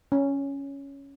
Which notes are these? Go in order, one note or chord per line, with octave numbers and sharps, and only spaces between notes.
C#4